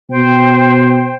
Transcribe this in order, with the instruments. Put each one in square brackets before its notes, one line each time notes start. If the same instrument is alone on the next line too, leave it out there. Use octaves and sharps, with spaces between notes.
[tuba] B2 [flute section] C5 G5